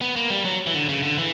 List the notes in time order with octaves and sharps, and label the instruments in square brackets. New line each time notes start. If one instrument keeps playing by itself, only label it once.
[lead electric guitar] B3
A#3
G3
F#3
E3
D3
C#3
D3
E3